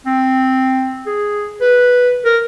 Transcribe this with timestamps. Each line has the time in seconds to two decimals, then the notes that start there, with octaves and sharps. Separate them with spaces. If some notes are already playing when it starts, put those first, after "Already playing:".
0.06 C4
1.06 G#4
1.61 B4
2.25 A#4